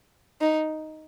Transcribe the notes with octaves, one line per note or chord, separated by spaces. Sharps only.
D#4